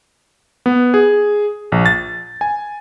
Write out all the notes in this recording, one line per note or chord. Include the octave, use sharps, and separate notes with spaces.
B3
G#4
A#1
A6
G#5